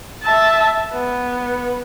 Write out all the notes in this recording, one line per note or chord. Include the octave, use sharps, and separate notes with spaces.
E5 A5
B3